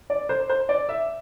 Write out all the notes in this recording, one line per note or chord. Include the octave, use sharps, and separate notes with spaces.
D5
C5
C5
D5
E5